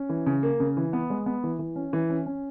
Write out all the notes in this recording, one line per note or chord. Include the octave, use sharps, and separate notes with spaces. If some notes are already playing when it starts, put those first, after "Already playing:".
Already playing: C#4
E3
C#3
A#3
C#3
E3
B3
G#3
B3
E3
E3
C#4
E3
C#4
C#4